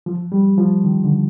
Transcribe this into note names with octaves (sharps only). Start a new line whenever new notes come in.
F3
G3
F3
D#3
D3